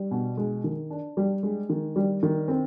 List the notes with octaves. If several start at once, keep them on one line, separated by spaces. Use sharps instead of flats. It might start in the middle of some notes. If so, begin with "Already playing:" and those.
Already playing: G3
B2
G#3
D#3
D4
G3
G#3
D#3
G3
D#3
C4